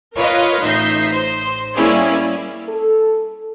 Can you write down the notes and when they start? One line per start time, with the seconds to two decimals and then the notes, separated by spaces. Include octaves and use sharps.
0.16 F4 A#4 B4 C#5 D#5 F5
0.62 A1 D#4 E5 G6 A#6 C7
1.13 C5
1.75 G3 A#3 C#4 E4 G#4 D5
2.69 A4